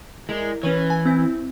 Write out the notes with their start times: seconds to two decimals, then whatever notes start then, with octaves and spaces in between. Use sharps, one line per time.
0.29 G#3 E4 A#4 D5
0.63 E3 C#4 B4 C#5
0.90 G#5
1.05 C4 E4